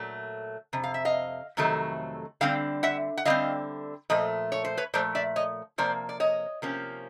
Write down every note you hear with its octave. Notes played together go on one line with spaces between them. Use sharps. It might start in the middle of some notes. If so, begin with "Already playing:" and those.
Already playing: A#2 F#3 A3
F2 C3
F5
E5
D#5 F5
F2 C3 D#3 F#3 A3
D3 G3 C4 F5 G5
E5 F#5
F#5
D3 G3 C4 D#5 F5
A#2 F3 A3 D#5
C#5
C5
B4 C#5
A#2 F3 A3 C5 D5
D5 E5
C#5 D#5
C3 F3 A#3 C5 D5
D5
C#5 D#5
C3 F3 A#3 C#4